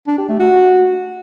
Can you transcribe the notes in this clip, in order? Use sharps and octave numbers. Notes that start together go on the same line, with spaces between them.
D4
G4
A3
F#4